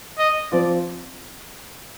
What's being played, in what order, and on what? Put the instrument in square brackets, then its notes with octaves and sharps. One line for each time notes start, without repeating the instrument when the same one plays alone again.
[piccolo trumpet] D#5
[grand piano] F3 C4 F4 [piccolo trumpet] D5